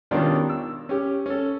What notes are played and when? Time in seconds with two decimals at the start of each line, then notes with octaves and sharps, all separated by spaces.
0.11 B2 D#3 G3 C#4 D4 F4
0.50 E6
0.89 C#4 G4
1.26 C#4 A4